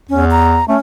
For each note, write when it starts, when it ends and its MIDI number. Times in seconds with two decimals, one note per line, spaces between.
0.09 0.61 40
0.09 0.25 61
0.31 0.65 82
0.68 0.76 57
0.68 0.79 61